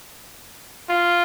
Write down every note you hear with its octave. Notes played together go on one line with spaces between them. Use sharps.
F4